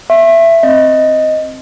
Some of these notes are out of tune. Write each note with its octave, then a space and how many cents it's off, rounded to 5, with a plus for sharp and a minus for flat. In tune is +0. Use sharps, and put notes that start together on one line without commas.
E5 +15 C#6 -45
C4 +0 D#5 +0